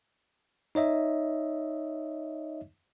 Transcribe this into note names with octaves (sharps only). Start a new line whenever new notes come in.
D#4 C#5 D#5 E5